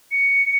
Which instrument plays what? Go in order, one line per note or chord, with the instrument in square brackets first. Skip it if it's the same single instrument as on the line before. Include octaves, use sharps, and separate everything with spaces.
[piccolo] C#7